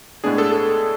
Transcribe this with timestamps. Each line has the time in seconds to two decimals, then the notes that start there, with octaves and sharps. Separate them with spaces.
0.24 A2 G#3 B3 D4 G#4
0.38 A4
0.52 A4